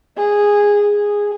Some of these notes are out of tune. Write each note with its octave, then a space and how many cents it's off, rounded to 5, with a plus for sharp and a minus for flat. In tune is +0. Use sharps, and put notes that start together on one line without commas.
G#4 -10
G#4 -10